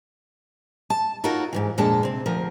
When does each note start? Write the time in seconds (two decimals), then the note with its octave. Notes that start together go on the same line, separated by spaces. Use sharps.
0.90 A5
1.24 D#4 F4 F#4 A4 A#4 C#5
1.53 G#2 C3 E3
1.78 F2 A#2 G#3 D4 A4 A5
2.03 C3 C4
2.26 D2 F3 A#4